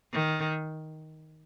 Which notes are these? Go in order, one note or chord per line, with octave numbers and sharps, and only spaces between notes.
D#3